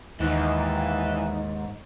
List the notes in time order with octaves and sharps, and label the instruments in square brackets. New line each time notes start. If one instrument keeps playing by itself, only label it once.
[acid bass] D#2 [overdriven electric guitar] G#2 [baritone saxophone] E3 [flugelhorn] D#4